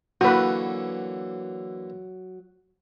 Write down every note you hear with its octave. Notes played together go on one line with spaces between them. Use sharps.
D3 E3 F#3 A#3 F#4 B4